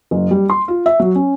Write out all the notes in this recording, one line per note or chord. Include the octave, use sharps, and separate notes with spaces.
F#1
G3
C6
F4
E5
F#3
C#4